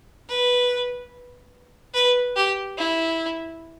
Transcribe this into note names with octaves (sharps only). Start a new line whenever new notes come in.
B4
B4
G4
E4